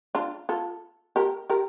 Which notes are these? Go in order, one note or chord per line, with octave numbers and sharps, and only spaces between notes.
D4 F4
F4 A4
G4 A#4
G4 A#4